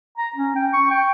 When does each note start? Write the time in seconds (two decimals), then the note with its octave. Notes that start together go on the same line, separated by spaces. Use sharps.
0.18 A#5
0.36 C#4
0.56 G5
0.73 C#6
0.91 G5